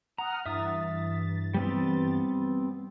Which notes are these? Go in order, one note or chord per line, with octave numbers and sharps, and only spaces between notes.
F#5 A#5 D#6 F6
G2 E3 E5 D#6 A6
G3 B3 C4